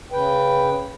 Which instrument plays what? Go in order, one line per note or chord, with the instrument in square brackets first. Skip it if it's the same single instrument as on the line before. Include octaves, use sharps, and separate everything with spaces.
[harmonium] C#3 B4 G5